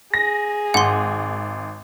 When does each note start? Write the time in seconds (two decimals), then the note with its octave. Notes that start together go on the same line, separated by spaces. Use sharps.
0.14 G#4 A#6
0.74 G#1 F#5 C6